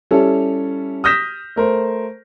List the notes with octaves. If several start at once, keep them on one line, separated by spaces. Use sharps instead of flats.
G3 C#4 E4 A4
D#6 F6 G6 A#6 B6 E7
A3 A#4 C5